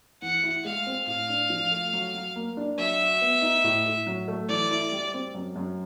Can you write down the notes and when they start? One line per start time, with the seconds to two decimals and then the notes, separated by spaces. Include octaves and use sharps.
0.22 E3 F#5
0.43 E4
0.65 G#3 F5
0.87 C4
1.07 A2 F5
1.29 D4
1.50 F3
1.71 A3
1.93 F#3
2.15 F#3
2.36 A#3
2.57 D4
2.78 F#3 E5
3.00 F#4
3.22 B3
3.42 D#4
3.64 A2
3.86 A2
4.07 F#3
4.28 A3
4.49 E3 D5
4.70 E4
4.92 G3
5.14 C4
5.34 F#2
5.56 F#2